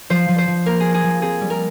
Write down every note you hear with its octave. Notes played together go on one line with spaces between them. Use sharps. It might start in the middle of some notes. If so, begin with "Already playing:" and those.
F3 C5
F3
C5
F3
A#3 A#4
A#3 G#4
G#4
F3
C4 G#4
G3
A#4